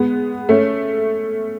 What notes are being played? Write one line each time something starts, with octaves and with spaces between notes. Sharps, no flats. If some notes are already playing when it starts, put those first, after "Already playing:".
Already playing: G#3 B3
A3 C#4